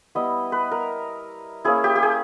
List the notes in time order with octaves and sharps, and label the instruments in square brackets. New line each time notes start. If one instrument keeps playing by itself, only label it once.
[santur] G3 B3 E4 D#5
B4
A#4
A#3 C#4 E4 G#4
G4
G4
G#4